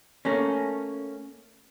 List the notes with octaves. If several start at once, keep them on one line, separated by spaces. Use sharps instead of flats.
A3 A#3 C#4